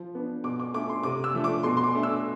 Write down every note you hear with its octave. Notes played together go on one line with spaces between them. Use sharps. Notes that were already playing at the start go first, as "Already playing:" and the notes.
Already playing: F3
B3 D4
B2 D6
D6
A3 D4 D6
C6
C3 D6
E6
F3 A3 D4
D6
B2 C6
C6
D6
A3 D4
E6